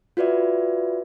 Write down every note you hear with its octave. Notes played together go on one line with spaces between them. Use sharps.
F4 F#4 B4 D5 E5